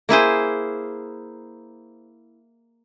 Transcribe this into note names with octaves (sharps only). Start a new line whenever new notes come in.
A#3 E4 G#4 C5